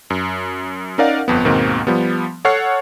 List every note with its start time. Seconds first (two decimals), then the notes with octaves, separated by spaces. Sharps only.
0.10 F#2
0.98 C#4 D#4 A#4 D5 F5 F#5
1.28 G1 F2 B3
1.45 D#2 G#2 B2 D#3 A#3 C4
1.87 F3 G3 B3
2.45 A4 C#5 F#5 C#6 F6 C7